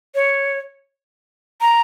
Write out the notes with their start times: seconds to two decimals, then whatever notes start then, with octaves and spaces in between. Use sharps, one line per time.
0.15 C#5
1.61 A#5